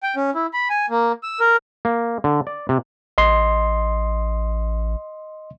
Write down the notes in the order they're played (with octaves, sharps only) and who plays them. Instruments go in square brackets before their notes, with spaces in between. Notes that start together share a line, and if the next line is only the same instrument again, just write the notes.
[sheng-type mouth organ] G5
C#4
E4
B5
G#5
A#3
E6
A#4
[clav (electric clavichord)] A#3
D3
D5
C3
[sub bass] A1 [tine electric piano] D#5 C6